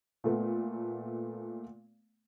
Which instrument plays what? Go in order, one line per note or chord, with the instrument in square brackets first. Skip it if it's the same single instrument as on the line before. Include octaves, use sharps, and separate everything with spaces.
[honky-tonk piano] A#2 A3 B3